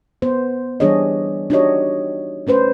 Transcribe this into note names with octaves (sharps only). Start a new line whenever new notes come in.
B3 C5
E3 G3 D4 G#4 C#5 D#5
D4 D#4 F#4 G4 C#5 D#5
A3 C#4 B4 C5